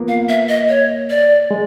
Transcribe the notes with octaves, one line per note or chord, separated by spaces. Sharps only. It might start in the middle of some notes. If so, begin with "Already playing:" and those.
Already playing: A#3 B3 F4
F5
E5
D#5
C#5
D5
G#3